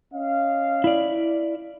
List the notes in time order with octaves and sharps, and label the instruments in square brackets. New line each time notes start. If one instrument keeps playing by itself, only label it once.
[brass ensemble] C#4 D#5 F5
[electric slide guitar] E4 D5